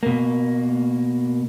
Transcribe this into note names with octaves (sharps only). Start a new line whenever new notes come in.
B2 A#3